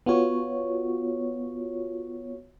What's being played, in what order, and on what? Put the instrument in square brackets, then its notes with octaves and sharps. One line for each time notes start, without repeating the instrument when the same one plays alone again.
[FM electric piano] B3 F4 F#4 C#5